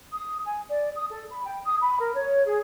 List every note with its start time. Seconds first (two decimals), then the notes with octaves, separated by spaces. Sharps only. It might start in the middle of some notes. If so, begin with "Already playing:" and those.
0.12 D#6
0.44 G#5
0.68 D5
0.95 D#6
1.10 A4
1.30 B5
1.46 G5
1.65 D#6
1.82 B5
1.99 A#4
2.15 C#5
2.46 G#4